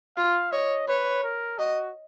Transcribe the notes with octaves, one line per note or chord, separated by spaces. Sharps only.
F4 F5
C#5 D#5
B4 C#5
A#4
F#4 D#5